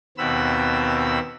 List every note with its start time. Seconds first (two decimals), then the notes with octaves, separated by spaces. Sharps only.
0.18 D#2 B2 B3 C4 B5 E6